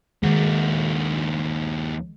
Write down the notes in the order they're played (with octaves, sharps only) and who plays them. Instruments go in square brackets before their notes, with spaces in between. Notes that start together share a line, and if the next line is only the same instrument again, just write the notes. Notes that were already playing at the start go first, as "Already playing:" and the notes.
[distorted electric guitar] D#2 F#4 [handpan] D#3 G#3